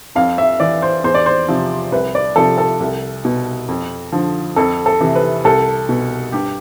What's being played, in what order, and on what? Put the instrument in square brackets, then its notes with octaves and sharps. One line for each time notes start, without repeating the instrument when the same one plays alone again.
[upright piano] F2 F5
E5
E3 D5
C5
E2 C5
D5
C5
C3 F3
C2 B4
D5
C3 F3 A4
A4
C2
B2
F2
D3 F3
F2 A4
A4
C3 E3
B4
C2 A4
B2
G2 G4